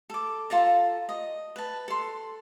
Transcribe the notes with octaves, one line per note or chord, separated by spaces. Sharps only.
A4 D6
F4 A4 A5 A#5
D#5
B4 A5
A4 C6